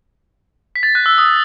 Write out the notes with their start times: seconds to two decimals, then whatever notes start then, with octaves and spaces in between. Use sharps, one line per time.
0.76 B6
0.83 A6
0.95 F#6
1.06 E6
1.18 D#6